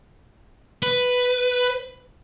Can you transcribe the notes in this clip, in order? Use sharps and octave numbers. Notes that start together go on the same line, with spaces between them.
B4